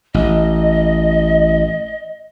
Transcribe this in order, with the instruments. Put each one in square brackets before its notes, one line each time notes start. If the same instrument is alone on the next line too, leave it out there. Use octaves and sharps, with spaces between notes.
[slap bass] A1 [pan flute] D#5